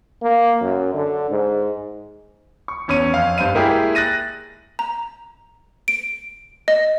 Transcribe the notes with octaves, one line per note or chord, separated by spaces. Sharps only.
A#3
F#2
D3
G#2
C#6
E2 C#4 C#6 D#7
F2 F5
G2 C5 F5 D#7
G#3 A#3 E4 G4 G#4
F#6 A6 A#6 D#7
A#5
D7
D#5